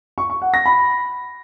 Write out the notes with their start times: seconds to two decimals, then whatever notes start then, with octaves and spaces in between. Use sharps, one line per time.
0.18 C#6
0.30 C#6
0.42 F#5
0.54 A#6
0.66 B5